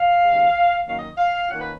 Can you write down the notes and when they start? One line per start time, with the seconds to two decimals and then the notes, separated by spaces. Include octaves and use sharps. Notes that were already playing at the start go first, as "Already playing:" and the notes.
Already playing: F5
0.24 D#2 C#3 G#3
0.86 F#2 D#3 F#3 A#3 C#4 F5
0.97 D#5
1.18 F5
1.49 D#3 A#3 C#4 F4 F#5
1.60 B4